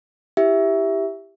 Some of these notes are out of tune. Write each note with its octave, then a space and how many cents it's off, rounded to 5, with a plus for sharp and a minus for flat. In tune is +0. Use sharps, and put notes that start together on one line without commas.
E4 +0 G4 +0 E5 +0